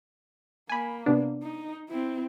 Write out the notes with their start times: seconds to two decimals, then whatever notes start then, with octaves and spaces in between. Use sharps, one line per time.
0.69 A#3 G#5 B5
1.06 C3 B3 D4
1.43 D#4
1.89 C4 E4